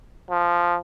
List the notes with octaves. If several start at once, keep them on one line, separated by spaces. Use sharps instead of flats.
F3